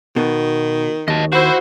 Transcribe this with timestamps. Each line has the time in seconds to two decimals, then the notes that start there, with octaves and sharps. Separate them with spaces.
0.16 B2 D#3
1.08 D#2 D#5 A5
1.33 E4 F#4 C5